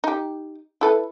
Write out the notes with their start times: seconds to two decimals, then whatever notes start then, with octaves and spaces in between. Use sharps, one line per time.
0.04 D#4 G4
0.81 E4 A4 B4